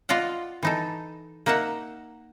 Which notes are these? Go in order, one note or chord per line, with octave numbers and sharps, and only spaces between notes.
F4 D5 D#5 F5 F#5
E3 D#4 A4
A#3 D#4 A#4 E5 F#5